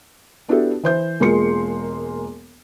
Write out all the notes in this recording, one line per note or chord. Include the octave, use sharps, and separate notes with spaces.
B3 D4 E4 F#4 G4 A4
E3 C5 G6
E1 G#3 A#3 F4 C6 C#7